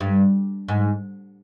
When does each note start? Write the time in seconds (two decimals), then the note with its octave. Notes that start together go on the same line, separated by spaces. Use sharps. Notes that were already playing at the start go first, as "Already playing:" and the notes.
0.01 G2
0.68 G#2